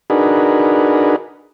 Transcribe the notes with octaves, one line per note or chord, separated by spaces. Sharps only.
D4 D#4 F#4 G#4 A#4 B4